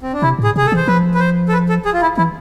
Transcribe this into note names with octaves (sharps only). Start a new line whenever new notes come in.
C4
D4
C3 E4
A2 G#4
C3 G#4
A4
E3 C5
F3 B4
B4
C5
A4
B4
A4
G#4
F4
E4
E3 E4